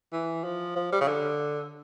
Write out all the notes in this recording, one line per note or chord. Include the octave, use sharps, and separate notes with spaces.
E3
F3
F3
G3
C#3
D3